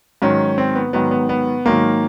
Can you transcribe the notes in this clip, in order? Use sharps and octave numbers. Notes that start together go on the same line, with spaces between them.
G#2 D#3 F#3 C#4
C4
B3
G#2 D#3 F#3 B3
B3
B3
G#2 D#3 F#3 A#3